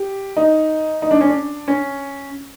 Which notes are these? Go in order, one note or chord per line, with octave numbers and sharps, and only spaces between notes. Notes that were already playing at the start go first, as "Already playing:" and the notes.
Already playing: G4
D#4
D#4
D4
C#4
D4
C#4